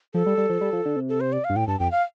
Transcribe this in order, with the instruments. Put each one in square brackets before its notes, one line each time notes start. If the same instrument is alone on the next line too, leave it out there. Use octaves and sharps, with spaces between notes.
[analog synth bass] F3 [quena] A4
[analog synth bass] G3
G3
F3
G3
F3
D3
C3
[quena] A4
C5
D5
F5
[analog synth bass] G2
[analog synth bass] A2 [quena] G5
[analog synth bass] G2 [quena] A5
[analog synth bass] F2 [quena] G5
[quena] F5